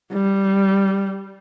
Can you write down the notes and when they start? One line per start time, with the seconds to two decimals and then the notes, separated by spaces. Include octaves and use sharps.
0.13 G3